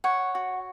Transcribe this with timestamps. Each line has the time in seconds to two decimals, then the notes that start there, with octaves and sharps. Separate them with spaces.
0.04 C#5 F#5
0.35 F#4